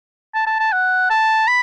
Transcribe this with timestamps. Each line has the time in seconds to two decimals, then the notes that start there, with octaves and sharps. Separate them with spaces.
0.35 A5
0.47 A5
0.59 A5
0.72 F#5
1.10 A5
1.47 B5